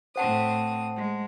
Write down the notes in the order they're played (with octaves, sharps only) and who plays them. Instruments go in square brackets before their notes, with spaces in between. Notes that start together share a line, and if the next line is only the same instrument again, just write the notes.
[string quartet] A2 C4 D#6 [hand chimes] C5 F#5 A5
[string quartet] G#3